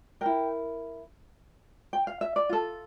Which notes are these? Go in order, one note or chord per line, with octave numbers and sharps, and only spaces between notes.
E4 A#4 G5
G5
F5
E5
D5
F4 A4